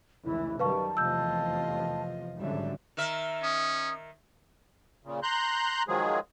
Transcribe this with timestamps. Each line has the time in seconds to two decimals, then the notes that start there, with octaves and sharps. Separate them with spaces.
0.25 F1 C#2 E3 E4
0.59 F#2 D#3 G3 B4 F5 A5 C#6
0.97 F1 E2 F3 F4 D#5 E6 G6
2.37 G#1 F#2 D3 G3 E5
2.97 D#3 A#4 E5
3.43 C#4 D#6
5.04 A#2 C#3
5.23 A#5 C6 F#6 G6
5.88 D#3 F3 F#3 G#3 G#4